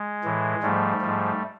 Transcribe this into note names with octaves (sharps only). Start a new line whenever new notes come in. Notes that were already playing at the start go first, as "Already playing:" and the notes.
Already playing: G#3
A2 E3
G#2 F3 G3 A3
G#2 F3